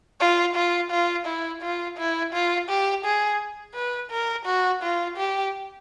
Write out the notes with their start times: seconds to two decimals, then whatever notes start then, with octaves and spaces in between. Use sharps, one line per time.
0.20 F4
0.55 F4
0.91 F4
1.26 E4
1.62 F4
1.97 E4
2.33 F4
2.69 G4
3.05 G#4
3.75 B4
4.11 A#4
4.46 F#4
4.82 F4
5.17 G4